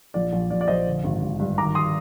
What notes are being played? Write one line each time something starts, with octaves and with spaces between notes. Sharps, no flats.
A#1 D5
A#1
A#1 D5
D5
A#1 C5 D#5
D3
G#1
G#1
G2
D#3 A#5 D6
C6 D#6